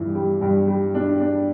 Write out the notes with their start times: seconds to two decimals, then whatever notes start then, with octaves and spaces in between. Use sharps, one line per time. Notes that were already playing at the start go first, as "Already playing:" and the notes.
Already playing: G2 E3
0.15 G3
0.41 G2
0.67 G3
0.95 D4
1.20 D4